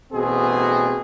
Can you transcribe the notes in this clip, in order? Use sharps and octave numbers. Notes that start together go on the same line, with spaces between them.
A1 B2 C4 G#4